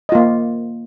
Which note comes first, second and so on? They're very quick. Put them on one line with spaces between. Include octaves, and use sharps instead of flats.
D#5 F4 A#3